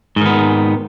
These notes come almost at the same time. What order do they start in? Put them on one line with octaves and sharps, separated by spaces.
G#2 D#3 B3